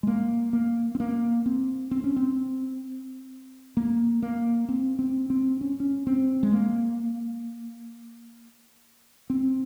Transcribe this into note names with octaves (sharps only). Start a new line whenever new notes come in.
G#3
A#3
A#3
C4
A#3
C4
C4
C#4
C4
A#3
A#3
C4
C4
C4
C#4
C#4
C4
G#3
A#3
C4